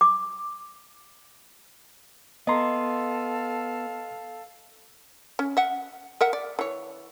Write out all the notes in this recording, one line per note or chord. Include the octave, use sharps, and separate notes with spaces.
D6
B3 A4 D#5 F5 A#5 C6
C#4
E5 F#5
A#4 E5 F#5
D5
E3 C#5